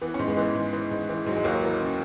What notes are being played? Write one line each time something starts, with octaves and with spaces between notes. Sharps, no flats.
E3 B3
C#4
G#2
G#3 B3
E3
G#2
E3
G#2
E3
G#2 F#3
G#3
D#2 F#3 A#3
E3
C#3